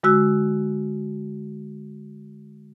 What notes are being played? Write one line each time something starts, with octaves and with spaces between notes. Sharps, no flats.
D3 G#3 F#4 E6 F#6